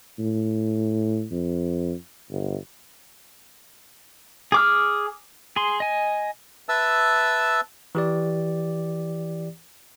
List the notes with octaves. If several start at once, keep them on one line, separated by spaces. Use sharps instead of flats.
A2
F2
G1
G#4 D6 F6
G#4 C6
D#5 G#5
B4 E5 A5 E6
E3 G4 D5